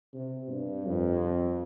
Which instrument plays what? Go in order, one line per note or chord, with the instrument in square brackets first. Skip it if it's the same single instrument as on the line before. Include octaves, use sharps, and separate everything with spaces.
[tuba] C3
G2
F2